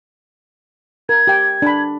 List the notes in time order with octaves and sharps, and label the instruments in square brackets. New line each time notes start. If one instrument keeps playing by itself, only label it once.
[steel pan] A#4 [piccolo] G#6
[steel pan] G4 G5
D4 B5